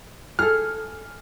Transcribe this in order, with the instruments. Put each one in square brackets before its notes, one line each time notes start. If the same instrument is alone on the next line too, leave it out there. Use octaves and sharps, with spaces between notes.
[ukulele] G#4 A4 [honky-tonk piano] F6